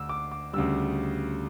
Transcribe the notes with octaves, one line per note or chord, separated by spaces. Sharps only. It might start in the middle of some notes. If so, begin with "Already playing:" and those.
Already playing: D2 D3 E6
D6
D6
D2 C#3 G3 E6